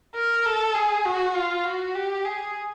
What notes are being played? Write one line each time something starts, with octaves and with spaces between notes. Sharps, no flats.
A#4
A4
G#4
F#4
F4
F#4
G4
G#4